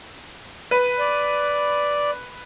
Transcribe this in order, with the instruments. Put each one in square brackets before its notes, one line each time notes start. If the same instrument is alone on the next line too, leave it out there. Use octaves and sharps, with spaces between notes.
[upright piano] B4
[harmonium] D5